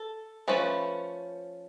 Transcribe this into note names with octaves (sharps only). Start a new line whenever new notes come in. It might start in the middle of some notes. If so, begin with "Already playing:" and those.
Already playing: A4
F3 A3 C#4 B4